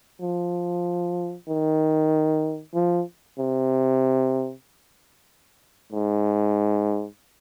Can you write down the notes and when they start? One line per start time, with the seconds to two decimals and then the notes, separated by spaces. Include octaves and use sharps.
0.21 F3
1.48 D#3
2.74 F3
3.39 C3
5.92 G#2